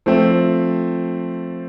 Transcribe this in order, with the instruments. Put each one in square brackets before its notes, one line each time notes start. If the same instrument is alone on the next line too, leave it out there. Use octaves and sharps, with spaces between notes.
[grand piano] F3 A3 C4